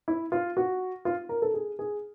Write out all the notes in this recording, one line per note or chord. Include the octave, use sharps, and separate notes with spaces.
E4
F4
F#4
F4
A#4
A4
G#4
G#4